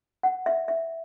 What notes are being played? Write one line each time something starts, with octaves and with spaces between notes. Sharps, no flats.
F#5
E5
E5